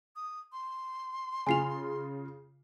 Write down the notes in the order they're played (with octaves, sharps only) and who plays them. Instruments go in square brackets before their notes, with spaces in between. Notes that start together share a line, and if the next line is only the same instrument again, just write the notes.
[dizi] D#6
C6
[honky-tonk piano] C#3 F4 [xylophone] G#5 C7 F7